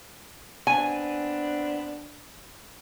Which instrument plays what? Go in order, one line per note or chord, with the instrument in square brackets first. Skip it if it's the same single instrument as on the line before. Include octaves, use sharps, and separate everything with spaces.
[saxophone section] B3 C4 D4 [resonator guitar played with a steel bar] G#5